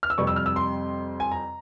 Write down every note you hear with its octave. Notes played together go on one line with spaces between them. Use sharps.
F6
E6
F2 C3 G3 C#6
E6
F6
E6
C6
G#5
A#5